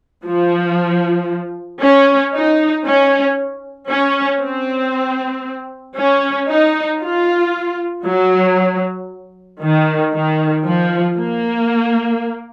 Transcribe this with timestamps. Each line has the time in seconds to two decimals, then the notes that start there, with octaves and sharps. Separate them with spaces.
0.25 F3
1.82 C#4
2.33 D#4
2.86 C#4
3.90 C#4
4.41 C4
5.98 C#4
6.49 D#4
7.02 F4
8.05 F#3
9.62 D#3
10.14 D#3
10.66 F3
11.18 A#3